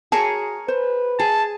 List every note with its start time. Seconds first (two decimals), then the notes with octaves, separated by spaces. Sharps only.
0.12 F#4 G#4 A#4 C#5 A5
0.68 B4 C5
1.19 G#4 A5